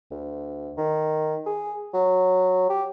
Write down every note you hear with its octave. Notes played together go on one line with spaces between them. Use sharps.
D2
D#3
G#4
F#3
G4